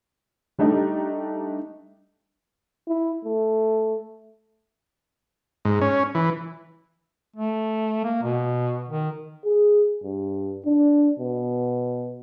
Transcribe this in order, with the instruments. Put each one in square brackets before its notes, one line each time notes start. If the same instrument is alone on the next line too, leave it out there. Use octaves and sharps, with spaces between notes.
[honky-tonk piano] G3 A3 D4 D#4 G4
[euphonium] E4
A3
[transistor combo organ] G#2
C#4
E3
[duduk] A3
A#3
B2
D#3
[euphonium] G#4
G2
D4
B2